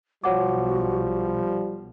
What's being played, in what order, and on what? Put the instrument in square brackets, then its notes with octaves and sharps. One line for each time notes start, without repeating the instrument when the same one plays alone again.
[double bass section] B1 B2 [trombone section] F3 G3 [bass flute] F#4 [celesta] C#5 F#5 D6